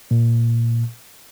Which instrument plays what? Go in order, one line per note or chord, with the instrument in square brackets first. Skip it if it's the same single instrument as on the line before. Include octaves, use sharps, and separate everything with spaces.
[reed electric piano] A#2